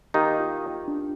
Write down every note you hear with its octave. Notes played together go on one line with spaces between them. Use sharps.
D#3 A#3 D#4 G4
F4
D4